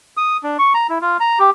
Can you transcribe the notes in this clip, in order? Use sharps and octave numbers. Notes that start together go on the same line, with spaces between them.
D#6
D4
C#6
A#5
E4
F4
A#5
G4